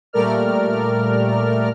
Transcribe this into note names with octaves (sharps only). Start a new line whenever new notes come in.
A#2 G3 A3 A#4 D5 F6